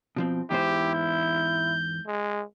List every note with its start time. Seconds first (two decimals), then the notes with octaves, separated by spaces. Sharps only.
0.16 B2 F3 C4
0.51 E2 G#2 E4 G4 C5
0.94 G6
2.07 G#3